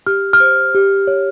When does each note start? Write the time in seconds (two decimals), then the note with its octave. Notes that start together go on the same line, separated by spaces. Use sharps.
0.06 G4 F6
0.33 F6
0.40 C5
0.74 G4
1.07 C#5